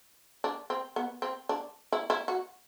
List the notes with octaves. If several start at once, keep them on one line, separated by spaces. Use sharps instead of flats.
D4
C4
B3
C4
D4
E4
E4
F#4